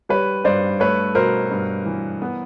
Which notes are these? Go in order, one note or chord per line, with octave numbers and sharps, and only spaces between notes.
G3 B4 C#5
G2 C5 D5
A3 B4 C#5
B2 A#4 C5
G2
E3
B3